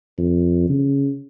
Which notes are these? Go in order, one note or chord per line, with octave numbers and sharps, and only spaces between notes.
F2
C#3